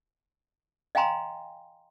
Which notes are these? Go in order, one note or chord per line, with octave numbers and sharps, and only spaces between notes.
D#5 F5 G5 G#5 A#5 C6